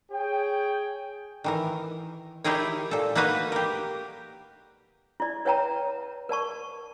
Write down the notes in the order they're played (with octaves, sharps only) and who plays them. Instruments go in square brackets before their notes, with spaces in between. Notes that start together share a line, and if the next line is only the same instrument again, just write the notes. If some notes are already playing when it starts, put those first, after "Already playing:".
[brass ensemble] G#4 C#5 G5
[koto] D#3 E3 A#4
D#4 E4 G4 G#4 A#4 C#5
A#2 A4
A#3 D#4 F#4 B4 D#5 F5
G4 A#4
[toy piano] E4 D5
B4 C#5 E5 G5 A5 A#5
A#4 D5 A5 C#6